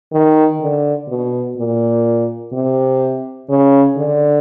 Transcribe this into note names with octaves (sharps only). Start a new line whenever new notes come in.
D#3
D3
B2
A#2
C3
C#3
D3